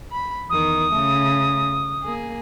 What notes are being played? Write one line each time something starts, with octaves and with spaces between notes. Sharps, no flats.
B5
E2 D#3 D#6
C#3 A3
A#3 G#4